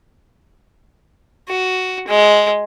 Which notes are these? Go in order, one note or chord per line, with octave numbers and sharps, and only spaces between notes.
F#4
G#3